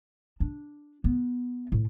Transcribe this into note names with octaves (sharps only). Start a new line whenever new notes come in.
D4
B3
A2